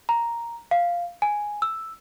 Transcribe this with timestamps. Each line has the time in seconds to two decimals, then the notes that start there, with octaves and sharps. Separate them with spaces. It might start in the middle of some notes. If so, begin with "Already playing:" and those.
0.09 A#5
0.71 F5
1.22 G#5
1.62 E6